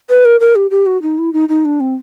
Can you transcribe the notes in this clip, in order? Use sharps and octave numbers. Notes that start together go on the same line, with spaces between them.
B4
A#4
A#4
G4
G4
F#4
D#4
E4
D#4
D#4
D4
C4